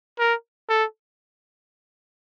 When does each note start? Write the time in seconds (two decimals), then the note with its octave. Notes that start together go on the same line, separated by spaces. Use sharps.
0.19 A#4
0.69 A4